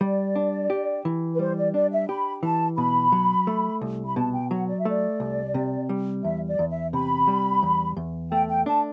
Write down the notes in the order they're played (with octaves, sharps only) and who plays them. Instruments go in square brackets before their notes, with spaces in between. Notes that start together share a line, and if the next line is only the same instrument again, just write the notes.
[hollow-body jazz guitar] G3 [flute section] D5
[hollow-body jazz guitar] D4
G4
E3
[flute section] B4
[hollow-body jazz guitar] G3 [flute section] C5
[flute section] D5
[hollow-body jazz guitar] D4 [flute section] D5
[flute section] E5
[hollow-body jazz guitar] G4 [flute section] B5
[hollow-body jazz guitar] E3 [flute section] A5
[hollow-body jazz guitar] B2 [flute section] B5
[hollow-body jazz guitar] F#3
A3
C2
[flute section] B5
[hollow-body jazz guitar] B2 [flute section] A5
[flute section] G5
[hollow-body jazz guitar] F#3 [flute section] F#5
[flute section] D5
E5
[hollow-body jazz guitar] A3 [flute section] D5
[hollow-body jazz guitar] C2
C3
G3
[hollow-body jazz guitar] E2 [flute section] E5
[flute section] D5
[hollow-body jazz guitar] E2
[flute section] E5
[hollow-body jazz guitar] C3 [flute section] B5
[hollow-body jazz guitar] G3
E2
E2
[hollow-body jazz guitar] A3 [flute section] G5
[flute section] G5
[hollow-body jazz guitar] D4 [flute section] A5